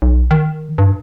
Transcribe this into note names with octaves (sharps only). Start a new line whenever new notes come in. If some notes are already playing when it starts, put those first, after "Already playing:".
B1
D#3
G2